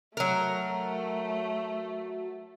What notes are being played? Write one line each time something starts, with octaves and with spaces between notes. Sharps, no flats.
F#3 A3 A#4